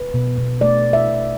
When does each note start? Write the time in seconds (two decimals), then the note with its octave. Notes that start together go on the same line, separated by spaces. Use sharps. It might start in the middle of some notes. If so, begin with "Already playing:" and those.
Already playing: B4
0.14 B2
0.38 B2
0.61 A3 D5
0.85 A3
0.93 E5
1.08 B2